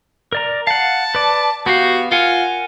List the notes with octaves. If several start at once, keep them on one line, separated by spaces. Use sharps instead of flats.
A#4 D5 A#5
F5 F#5 A5
B4 D5
B3 F#4 G4 F5
F4 A#4 F#5 G#5